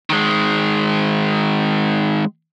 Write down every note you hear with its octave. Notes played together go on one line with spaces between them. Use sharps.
D#3 G#3